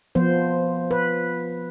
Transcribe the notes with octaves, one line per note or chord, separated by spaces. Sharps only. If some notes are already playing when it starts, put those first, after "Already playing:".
F3 B3 C5
B4